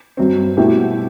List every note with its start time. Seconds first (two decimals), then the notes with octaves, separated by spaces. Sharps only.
0.17 G2 F#3 C4
0.57 B2 A3 E4 G4